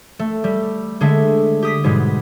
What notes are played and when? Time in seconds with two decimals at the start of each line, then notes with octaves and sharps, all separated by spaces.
0.19 A3
0.44 G3
1.01 D3 G#3 A3 E5
1.63 G4 D#6 B6
1.84 G#2 B2 G3 G#3